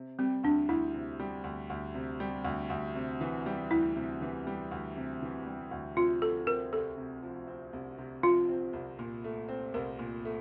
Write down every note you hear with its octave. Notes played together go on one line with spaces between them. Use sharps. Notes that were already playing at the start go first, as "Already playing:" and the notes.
Already playing: C3
G3 C4
D2 D4
D2 E4
C3
G3
D2
D2
C3
G3
D2
D2
C3
E3
G3
D2 E4
C3
E3
G3
D2
C3
E3
G3
D2
C3 F4
F3 A4
C4 A#4
C2 A4
C3
F3
C4
C2
C3
F3 F4
C4
C2
A#2
A3
C4
C2 A#4
A#2
A3